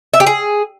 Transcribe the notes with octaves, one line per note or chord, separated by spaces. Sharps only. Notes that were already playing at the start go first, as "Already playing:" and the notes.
E5
G4
G#4